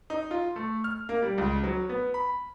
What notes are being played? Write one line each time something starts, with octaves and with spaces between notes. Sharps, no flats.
D#4
F4
A3
F6
A#3
G3
C#2
F#3
B3
B5